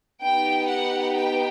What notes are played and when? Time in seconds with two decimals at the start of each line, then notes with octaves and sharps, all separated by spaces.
0.22 B3 D#4 G4 G5
0.68 F#5
1.16 G5